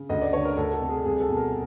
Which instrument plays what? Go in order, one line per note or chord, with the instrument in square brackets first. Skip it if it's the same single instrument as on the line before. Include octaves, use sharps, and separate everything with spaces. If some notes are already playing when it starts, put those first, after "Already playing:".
Already playing: [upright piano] C#3
D2 D#5
D5
D3 C#5
A#4
D2 A4
A4
C3
G#4
C2 G#4
A4
B2
A#4